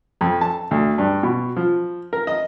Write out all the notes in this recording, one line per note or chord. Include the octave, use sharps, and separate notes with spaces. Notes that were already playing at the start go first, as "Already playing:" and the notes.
F2
A5
D2
G2
B2
F3
A#4
D#5